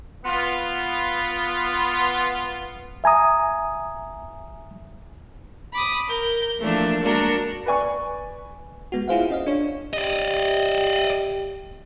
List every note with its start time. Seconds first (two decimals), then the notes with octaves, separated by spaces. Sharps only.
0.25 B3 F4
3.04 E5 G#5 A#5 D#6
5.72 B5 D6 D#6
6.07 A#4 G6
6.58 E3 F3 A3 A#3 D4
7.01 G#3 A#3 D4 F#4 A#4
7.66 B4 D5 G#5 C#6
8.92 G#3 B3 F#4
9.08 E4 F4 G#4 C5 F5 F#5
9.30 C#4 D#5 F5
9.46 D4 F4 C#5
9.93 G4 D5 D#5